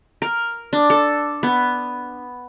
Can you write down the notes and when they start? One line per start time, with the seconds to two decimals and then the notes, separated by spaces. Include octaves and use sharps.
0.22 A#4
0.73 D4
0.90 A4
1.43 B3